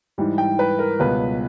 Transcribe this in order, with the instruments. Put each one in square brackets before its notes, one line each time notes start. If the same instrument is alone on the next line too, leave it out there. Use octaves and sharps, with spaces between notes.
[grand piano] G#2 E3 G3
G5
B4
A#4
C#2 B2 G3 B4